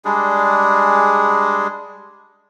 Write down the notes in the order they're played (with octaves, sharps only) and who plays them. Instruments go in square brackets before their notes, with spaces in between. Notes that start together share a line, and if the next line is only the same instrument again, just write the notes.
[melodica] G3 G#3 D4 G#4